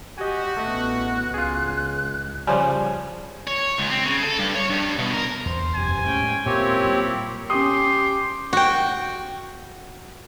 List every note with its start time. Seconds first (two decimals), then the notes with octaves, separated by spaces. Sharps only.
0.18 F#4 G4 D#5 G#5
0.57 A1 A3 B3 D#5 F#6
1.34 C#2 F4 G#4
2.47 C#3 F3 G3 G#5
3.47 C#5
3.78 C#2
3.91 C4
4.06 C#3
4.23 A4
4.39 G2
4.56 C#5
4.70 G2
4.99 B2
5.13 A#4
5.46 E2 C5
5.75 E1 F#2 G4 G#5
6.05 A2 G3 G#3 C#4 G5
6.46 A#2 G#3 A#3 C4 E4 F4 G4 C#5
6.84 A#2 F#3 G3
7.50 C#4 G4 C6 D#6
8.53 F#4 G5